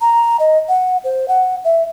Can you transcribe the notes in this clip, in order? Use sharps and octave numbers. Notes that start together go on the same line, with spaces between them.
A#5
D#5
F#5
C5
F#5
E5